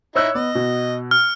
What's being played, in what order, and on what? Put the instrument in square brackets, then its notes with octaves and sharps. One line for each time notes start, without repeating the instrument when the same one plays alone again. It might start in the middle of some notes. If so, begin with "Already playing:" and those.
[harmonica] D#4 E4 [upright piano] C#5 E6 F#6
[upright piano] B3 [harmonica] D#5
[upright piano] B2
[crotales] F6